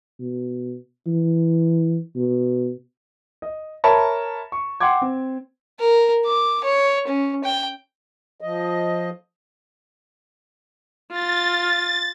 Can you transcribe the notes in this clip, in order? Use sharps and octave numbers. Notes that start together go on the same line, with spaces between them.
B2
E3
B2
D#5
A#4 C#5 E5 A5 B5
C#6
F#5 G5 C6 D6 G#6
C4
A#4
D6
C#5
C#4
G5
F3 D#5
F4 A6